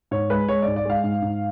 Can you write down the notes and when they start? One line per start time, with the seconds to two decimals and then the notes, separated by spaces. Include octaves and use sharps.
0.11 G#2 C#5
0.30 G#3 B4
0.49 G#3 C#5
0.62 G#2 D5
0.76 D5
0.85 G#3 F5
1.03 G#2
1.22 G#2